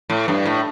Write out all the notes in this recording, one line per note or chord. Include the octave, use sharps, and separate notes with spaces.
A2
G2
A2